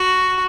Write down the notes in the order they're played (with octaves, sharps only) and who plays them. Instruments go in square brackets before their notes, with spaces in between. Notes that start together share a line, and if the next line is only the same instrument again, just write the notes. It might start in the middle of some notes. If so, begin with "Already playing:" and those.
Already playing: [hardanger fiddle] F#4